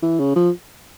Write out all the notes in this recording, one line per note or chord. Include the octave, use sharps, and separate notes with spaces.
E3
C#3
F3